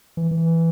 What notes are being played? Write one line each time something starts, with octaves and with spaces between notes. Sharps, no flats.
E3
E3